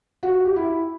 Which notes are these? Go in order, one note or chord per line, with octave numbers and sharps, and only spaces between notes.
F#4
F#4
G4
E4